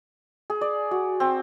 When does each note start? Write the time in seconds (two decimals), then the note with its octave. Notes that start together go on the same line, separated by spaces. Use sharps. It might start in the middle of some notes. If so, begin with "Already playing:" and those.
0.50 G#4
0.61 D5
0.91 F#4
1.20 C4